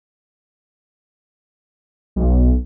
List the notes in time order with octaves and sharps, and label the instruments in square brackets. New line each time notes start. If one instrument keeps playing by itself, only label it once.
[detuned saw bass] B1